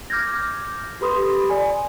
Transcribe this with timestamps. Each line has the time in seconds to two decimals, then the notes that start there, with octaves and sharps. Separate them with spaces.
0.10 D6 F6 G6 G#6 A#6
1.01 G4 A4 B4 B5 C6 D#6
1.50 D5 G#5